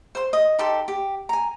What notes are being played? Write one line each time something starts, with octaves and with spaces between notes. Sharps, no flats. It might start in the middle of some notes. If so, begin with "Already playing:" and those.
C5 C6
D#5
D#4 G4 A4 C6
G4
G#5 A#5